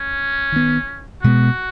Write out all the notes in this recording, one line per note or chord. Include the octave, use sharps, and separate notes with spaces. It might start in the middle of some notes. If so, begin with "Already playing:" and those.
Already playing: C#4
D#3 B3
B2 G#3 B3 F#4